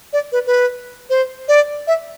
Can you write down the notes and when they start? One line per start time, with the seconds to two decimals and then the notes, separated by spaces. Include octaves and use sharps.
0.13 D5
0.32 B4
0.46 B4
1.10 C5
1.48 D5
1.87 E5